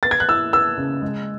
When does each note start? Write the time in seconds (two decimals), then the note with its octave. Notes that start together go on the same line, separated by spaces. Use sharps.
0.03 B3 A6
0.11 G#6
0.20 F#6
0.29 E4 E6
0.53 B3 E6
0.77 C#3
1.02 G#3